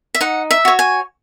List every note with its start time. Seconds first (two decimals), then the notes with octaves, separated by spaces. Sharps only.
0.15 E5
0.21 D#4 F#5
0.51 E5
0.65 F#4 C#5
0.79 G#5